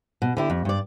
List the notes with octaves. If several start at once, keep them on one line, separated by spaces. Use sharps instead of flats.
B2
D3 E4 G4
F2
G2 D5